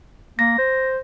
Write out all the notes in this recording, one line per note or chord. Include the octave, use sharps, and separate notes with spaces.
A#3 A#6
C5